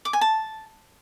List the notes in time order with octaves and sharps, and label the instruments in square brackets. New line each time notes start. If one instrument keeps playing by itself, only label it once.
[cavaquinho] D6
G#5
A5